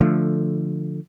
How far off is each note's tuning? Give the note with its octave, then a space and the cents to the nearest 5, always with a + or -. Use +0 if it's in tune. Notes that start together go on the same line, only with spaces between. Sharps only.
D3 +5 F3 +0 A3 +0